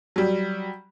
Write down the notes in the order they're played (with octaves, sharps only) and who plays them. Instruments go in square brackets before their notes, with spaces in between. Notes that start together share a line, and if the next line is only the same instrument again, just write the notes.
[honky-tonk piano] F#3 G3